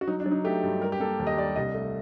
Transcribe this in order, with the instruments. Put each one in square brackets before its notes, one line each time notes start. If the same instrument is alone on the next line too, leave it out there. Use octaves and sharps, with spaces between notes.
[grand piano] F#4
F#3 D#4
D4
F#3
D#4
A3 G4
G2
G3 A#4
G4
A#3 A4
D#2
D#5
G3 D5
C2 D#5
A3